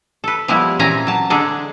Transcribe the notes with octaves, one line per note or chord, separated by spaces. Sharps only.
A4 B4
F3 G3 G#3 B3 E4
A#2 E3 C4 C#4 G#5 A#5
F#3 A5
D3 G#3 D4 G#4 A4